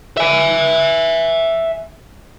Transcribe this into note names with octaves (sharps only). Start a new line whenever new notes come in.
E5 G#5